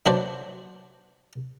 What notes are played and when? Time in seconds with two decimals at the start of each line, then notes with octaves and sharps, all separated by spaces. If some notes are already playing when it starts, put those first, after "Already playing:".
0.06 F#3 D4 F#4 B4 C5 D5